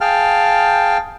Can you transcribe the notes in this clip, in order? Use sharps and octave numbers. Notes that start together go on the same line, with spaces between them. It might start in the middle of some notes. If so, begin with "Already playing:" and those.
G#4 F5 G5 A5 F6